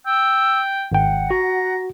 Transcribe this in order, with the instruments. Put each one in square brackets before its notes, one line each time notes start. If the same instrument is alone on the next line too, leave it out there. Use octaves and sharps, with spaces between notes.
[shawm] G5 [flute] E6
[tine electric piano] G#1 G5 [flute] F#5
[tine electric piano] F#4 [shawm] A#5